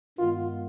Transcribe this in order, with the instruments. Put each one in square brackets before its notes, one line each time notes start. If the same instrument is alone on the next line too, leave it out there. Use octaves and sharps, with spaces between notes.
[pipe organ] G2 D#3 G#3 B3 [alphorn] F4